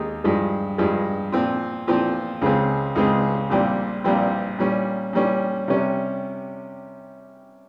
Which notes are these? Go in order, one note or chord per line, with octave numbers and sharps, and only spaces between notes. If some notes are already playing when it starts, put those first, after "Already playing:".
Already playing: D#2 D#3 G#3 D#4
G2 F3 G#3
G2 F3 G#3
A#2 F3 C4 F4
A#2 F3 C4 F4
C#2 C#3 G#3 C4
C#2 C#3 G#3 C4
A#1 A#2 G3 C4
A#1 A#2 G3 C4
A#2 G3 C#4
A#2 G3 C#4
C3 G3 C#4